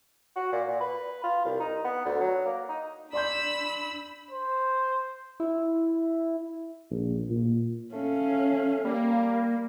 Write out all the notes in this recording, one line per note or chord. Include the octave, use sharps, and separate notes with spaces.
F#4
A#2
A#2
B4
F4
C2
D#4
B3
D2
F#3
A#3
D#4
D4 D5 B5 C6 E6 G6
C5
E4
A#1
A#2
A3 C#4 F5
G3 A#3